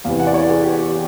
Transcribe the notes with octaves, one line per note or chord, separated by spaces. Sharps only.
E2 C3 E3 F5
F#5
D5
C#5
G#4
G4
G4